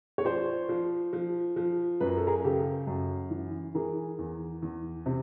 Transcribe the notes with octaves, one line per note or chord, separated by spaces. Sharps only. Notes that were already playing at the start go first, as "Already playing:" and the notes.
C#5
F3 C5 D5
F3
F3
F3
F#2 B4
A#4
A4
G#4 A#4
C#3 G4 A4
F#2
E3
E3 G#4 A#4
E2
E2
C3